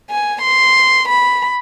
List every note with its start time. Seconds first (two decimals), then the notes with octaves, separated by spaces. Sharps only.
0.11 G#5
0.42 C6
1.08 B5